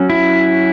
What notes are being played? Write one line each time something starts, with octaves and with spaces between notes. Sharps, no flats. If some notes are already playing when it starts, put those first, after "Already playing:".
Already playing: F#3 C#4
E4